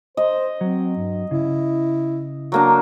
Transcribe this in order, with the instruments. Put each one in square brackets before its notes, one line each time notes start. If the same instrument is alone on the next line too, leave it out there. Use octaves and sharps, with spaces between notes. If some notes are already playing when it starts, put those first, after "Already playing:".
[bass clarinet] C5 [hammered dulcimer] D#5
[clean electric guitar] F#3 [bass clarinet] C4
[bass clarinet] G2
[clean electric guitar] C#3 [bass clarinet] E4
[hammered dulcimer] F#3 A#3 D4